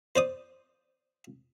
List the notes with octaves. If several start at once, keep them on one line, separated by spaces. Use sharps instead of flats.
C5 D5 D#6